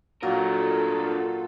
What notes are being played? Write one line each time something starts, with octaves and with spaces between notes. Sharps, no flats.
A#2 D3 F#3 F4 A4 A#4